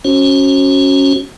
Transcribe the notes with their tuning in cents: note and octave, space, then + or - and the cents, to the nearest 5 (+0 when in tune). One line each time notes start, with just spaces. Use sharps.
C#4 +0 F#4 +5 C5 +45